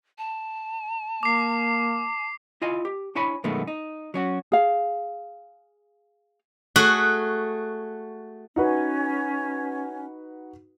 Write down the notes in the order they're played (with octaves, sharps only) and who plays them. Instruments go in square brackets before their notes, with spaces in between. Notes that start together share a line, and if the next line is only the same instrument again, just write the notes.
[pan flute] A5
[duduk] A#3 [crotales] D6 C7
[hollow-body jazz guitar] E4 F4 D#5 G#5
G4
D4 E4 C#5 G#5 B5
F#2 B2 D#3 G#3 A3 B3
D#4
F#3 C#4 F#4
[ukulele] G#4 F5
[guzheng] A3 F#4 G#4 F#5
[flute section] C#4 [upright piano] D#4 F#4 B4